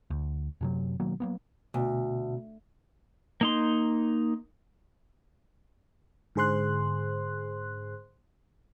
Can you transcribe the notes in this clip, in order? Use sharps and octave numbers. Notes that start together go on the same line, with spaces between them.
D2
F#2 C3 F#3
B2 D#3 F#3 A#3
F#3 A#3 B3
D2 B2
A#3 D#4 C6
G#2 D3 G#4 C5 C6 F#6